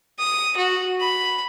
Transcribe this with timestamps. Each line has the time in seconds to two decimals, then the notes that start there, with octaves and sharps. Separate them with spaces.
0.19 D#6
0.57 F#4
1.00 B5